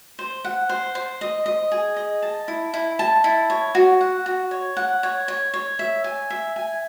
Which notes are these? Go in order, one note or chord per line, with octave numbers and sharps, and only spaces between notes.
C5
F#5
C5
C5
D#5
D#5
G#4
D#5
A5
E4
E4
A5
E4
C#5
F#4
F#5
F#4
C#5
F#5
C#5
C#5
C#5
E5
G#5
E5
G#5